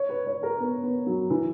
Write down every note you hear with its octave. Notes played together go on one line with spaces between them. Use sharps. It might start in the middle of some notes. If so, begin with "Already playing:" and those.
Already playing: C#5
B4
C#5
A#4
B3
B3
F#3
E3